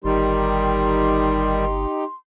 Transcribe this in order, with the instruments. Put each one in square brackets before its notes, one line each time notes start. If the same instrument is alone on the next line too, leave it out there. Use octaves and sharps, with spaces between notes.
[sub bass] G1 [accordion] D#3 G3 [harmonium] D#4 G4 [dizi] C6